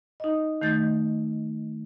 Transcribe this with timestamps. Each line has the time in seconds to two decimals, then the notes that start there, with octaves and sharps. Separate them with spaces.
0.20 D#4 D#5
0.62 D#3 A3 D#4 G6 A6